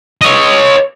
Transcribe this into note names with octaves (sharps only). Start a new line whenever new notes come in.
C#5 D#5